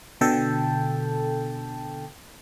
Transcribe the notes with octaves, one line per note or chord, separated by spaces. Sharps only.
B2 D3 A4 G5 A5